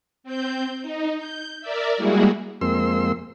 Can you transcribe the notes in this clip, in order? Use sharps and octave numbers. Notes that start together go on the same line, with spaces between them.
C4 G6
D#4
G6
A#4 D5 E5
G3 G#3 A#3 E4 F#4 G#4
F2 G#3 A#3 C4 C6 E6